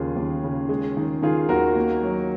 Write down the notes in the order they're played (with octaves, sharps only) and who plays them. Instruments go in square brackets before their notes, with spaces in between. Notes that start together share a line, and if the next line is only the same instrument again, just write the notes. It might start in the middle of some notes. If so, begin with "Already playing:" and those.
Already playing: [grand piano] D#2 C#3 F4 G#4
D#2
C#3
G#3
D#3
D#3 F4 G#4
D#2 F#4 A#4
A#3
F#3